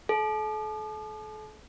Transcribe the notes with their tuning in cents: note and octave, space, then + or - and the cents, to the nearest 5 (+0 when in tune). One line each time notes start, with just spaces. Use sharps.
A4 -40